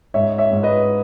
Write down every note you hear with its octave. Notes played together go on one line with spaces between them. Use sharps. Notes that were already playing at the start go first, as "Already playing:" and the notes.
G#2 C#5 E5
C#5 E5
G#2
B4 D#5